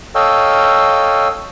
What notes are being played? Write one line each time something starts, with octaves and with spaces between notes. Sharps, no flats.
A4 C#5 D#5 F5 G5 E6